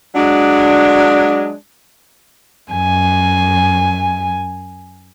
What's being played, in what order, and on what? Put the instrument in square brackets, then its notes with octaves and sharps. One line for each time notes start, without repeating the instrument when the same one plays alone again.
[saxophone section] F#3 G#3 D4
[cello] F#2 [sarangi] G#5